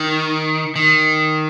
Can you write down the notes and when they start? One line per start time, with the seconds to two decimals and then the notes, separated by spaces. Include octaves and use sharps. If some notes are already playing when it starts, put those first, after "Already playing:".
Already playing: D#3
0.76 D#3